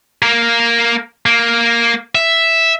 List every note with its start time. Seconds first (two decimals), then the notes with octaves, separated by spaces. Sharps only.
0.22 A#3 A#4
1.26 A#3
2.15 E5